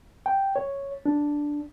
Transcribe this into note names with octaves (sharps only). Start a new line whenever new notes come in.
G5
C#5
D4